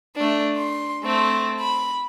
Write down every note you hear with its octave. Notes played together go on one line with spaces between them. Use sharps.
A3 D4
C6
A3 C4
B5